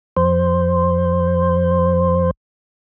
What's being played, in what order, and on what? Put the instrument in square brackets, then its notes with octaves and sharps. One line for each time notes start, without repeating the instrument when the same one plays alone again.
[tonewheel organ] F2 C5